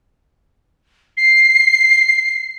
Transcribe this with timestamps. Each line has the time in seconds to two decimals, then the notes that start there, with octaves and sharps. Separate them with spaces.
1.17 C7